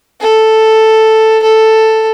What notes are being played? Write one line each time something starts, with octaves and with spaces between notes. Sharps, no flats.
A4
A4